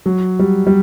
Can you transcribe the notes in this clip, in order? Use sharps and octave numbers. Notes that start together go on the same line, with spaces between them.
F#3
G3
G3